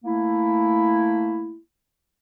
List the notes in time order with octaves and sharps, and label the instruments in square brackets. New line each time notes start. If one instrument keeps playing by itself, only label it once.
[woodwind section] A3 A#3 E4